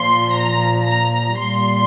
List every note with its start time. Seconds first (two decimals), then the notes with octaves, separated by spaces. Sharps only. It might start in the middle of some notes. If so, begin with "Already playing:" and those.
Already playing: A#2 F3 C6
0.36 A#5
0.86 A#5
1.37 A#2 G3 C6